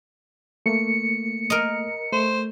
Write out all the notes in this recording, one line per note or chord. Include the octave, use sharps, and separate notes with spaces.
A3 A#3 C#7
A#4 D#5
A3 C5